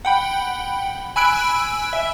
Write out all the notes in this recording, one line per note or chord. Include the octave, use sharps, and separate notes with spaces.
F#5 G5 B5
G#5 B5 E6 F#6 D7
E5